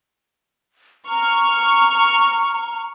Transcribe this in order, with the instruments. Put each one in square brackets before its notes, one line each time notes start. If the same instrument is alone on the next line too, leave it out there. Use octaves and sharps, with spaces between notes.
[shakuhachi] A#5 [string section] C#6 F6